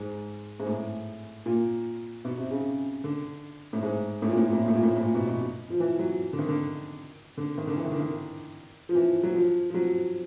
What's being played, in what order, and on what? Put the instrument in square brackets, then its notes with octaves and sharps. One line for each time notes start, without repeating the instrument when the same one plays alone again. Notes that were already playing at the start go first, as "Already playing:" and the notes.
Already playing: [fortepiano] G#2
G#2
A2
A#2
B2
C3
C#3
D3
A2
G#2
A2
A#2
A2
A#2
A2
A#2
A2
A#2
A2
A2
A#2
B2
B2
F3
E3
F#3
D3
D#3
D3
D3
D#3
D3
E3
D#3
D3
D#3
F3
E3
F#3
F3
F3
F#3